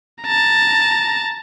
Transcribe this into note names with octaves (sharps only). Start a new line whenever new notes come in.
A5 A#5